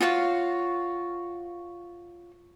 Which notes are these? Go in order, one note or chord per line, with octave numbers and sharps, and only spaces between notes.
F4 F#4 C#5 F5